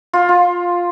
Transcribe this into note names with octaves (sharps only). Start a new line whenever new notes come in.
F4
F4